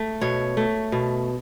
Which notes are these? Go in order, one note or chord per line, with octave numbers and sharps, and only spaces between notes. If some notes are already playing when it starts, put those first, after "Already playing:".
Already playing: A3
B2 C#5
A3
B2